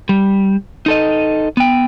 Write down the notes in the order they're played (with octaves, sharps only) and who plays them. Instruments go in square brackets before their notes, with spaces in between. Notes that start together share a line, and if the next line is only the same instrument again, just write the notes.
[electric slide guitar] G3
D#4 A4 D#5
B3 G5